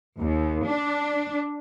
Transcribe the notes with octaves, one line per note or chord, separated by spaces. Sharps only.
D#2
D4